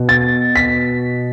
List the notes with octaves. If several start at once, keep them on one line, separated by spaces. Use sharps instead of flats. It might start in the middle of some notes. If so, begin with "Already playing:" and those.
Already playing: B2
A6
B6